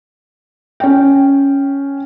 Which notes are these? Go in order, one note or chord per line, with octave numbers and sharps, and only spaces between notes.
C#4 G5